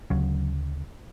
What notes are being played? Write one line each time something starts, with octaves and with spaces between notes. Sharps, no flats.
D2 C#3 F#3